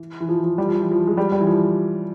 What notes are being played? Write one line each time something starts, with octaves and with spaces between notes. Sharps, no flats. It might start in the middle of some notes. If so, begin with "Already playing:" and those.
Already playing: E3
E3
F3
F3
G3
F3
E3
F3
G#3
G3
G3
E3
F3